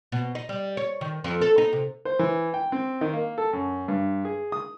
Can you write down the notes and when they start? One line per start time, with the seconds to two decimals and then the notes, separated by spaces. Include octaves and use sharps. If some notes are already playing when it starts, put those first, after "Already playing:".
0.12 B2
0.35 D#4
0.49 G3
0.77 C#5
1.01 D#3
1.24 F2
1.41 A4
1.58 D#4
1.73 C3
2.05 C5
2.19 E3
2.54 G5
2.72 C4
3.01 D#3
3.13 A#3
3.38 A4
3.53 F#2
3.88 G2
4.25 G#4
4.52 D#6